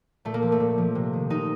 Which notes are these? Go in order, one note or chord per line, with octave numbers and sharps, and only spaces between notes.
A#2 A3
A#3
F3
A3
A#2
F3
C3
D#3
C3 D#4